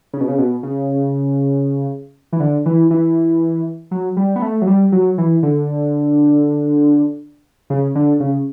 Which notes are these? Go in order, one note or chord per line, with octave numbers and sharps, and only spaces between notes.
C#3
B2
C#3
B2
C#3
E3
D3
E3
E3
F#3
G3
B3
A3
F#3
G3
F#3
E3
D3
C#3
D3
C#3